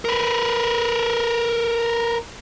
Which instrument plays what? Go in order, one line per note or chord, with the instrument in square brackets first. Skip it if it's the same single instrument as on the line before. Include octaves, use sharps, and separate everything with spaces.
[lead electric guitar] A#4 B4